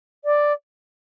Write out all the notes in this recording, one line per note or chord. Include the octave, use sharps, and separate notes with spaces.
D5